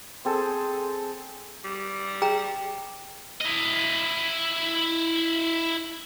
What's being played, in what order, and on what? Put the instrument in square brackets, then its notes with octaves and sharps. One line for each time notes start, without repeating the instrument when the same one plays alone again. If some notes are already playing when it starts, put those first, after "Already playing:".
[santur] C4 G#4 A4
[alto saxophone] G3
[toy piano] G#4 G5 A#5
[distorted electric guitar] E4 D#5